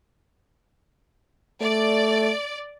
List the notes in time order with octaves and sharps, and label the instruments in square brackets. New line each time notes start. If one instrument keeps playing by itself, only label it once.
[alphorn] A3 [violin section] D5